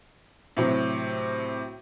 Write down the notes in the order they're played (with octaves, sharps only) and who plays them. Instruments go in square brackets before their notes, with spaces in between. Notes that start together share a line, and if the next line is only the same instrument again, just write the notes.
[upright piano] A2 C3 F#3